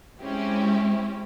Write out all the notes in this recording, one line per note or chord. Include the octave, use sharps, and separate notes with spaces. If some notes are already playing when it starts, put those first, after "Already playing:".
G#3 C4 C#4 E4 G4